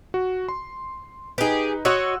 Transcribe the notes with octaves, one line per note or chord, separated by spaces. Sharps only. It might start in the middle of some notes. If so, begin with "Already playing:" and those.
F#4
C6
D#4 G4 G#4 B4
F#4 C#5 D#5 C6 E6 F#6